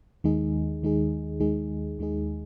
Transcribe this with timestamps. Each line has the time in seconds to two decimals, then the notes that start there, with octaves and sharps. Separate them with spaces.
0.24 D#2 D#3 G#3 D#4 G#4
0.82 D#2 D#3 G#3 D#4 G#4
1.40 D#2 D#3 G#3 D#4 G#4
1.99 D#2 D#3 G#3 D#4 G#4